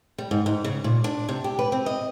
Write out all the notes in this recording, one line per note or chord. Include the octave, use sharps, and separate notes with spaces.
G3
G#2
G#2
C#3
A#2
D4
C3
G4
B4
C4
D#5